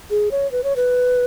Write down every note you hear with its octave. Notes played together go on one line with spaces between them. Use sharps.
G#4
C#5
B4
C#5
B4